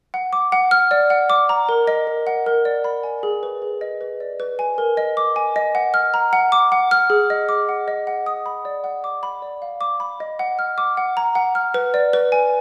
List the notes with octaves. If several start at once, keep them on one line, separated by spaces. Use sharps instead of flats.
F#5
D6
F#5
F6
D5
F#5
D6
A#5
A#4
D#5
A#4
F#5
A#4
D5
B5
G#5
G#4
B4
G#4
D#5
B4
D5
B4
G#5
A#4
D#5
D6
G#5
D#5
F#5
F6
A#5
F#5
D6
F#5
F6
G#4
D#5
D6
F#5
D#5
F#5
D#6
B5
D5
F#5
D6
B5
D5
F5
D6
B5
D#5
F#5
F6
D6
F#5
A#5
F#5
F6
B4
D5
B4
G#5